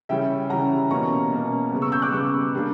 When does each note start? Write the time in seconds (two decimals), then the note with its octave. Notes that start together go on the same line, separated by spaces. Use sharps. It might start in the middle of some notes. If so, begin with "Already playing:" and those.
0.09 C#3 E3 G3 C#4 E5 G5
0.49 C#3 E3 G3 C#4 F#5 A#5
0.91 B2 A#3 C#4 A#5 C#6
1.32 B2 A#3 C#4
1.72 C#3 G3 B3
1.82 C#6 E6
1.92 E6 G6
2.02 D6 F#6
2.12 C#3 G3 B3 C#6 E6
2.53 C#3 G3 A#3 D4